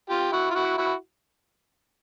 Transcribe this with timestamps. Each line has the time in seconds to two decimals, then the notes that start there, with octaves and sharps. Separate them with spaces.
0.09 F4 G4
0.32 E4 F#4
0.50 F4
0.55 E4 F#4
0.77 E4 F#4